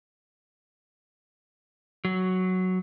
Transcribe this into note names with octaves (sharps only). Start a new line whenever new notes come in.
F#3